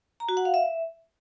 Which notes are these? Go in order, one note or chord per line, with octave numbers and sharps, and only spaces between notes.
A#5
F#4
F#5
F5
E5